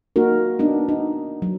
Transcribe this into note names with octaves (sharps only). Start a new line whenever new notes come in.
A#3 D#4 F#4 A#4
B3 D4 D#4
D#4
F#3